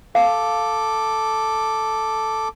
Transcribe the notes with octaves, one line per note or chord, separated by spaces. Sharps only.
A4 F5 D6